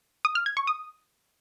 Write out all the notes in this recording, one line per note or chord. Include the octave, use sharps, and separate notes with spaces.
D#6
F6
G#6
C#6
D#6